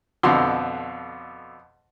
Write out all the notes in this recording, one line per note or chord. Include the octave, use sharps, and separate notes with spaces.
F2 B2 D3 C6 E6